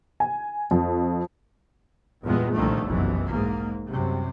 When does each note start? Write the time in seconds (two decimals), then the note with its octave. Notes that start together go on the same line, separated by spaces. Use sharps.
0.20 G#5
0.71 F2
2.23 E2 G2 A#2 G#3 B3
2.54 C2 A#2 D3 D#3 F3 A3
2.86 F1 B1 F#2 B2 E3
3.30 G#2 A#3
3.88 F#2 C3 G3